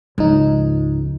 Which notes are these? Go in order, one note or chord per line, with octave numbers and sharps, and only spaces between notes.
C#2 G#2 F3 D#4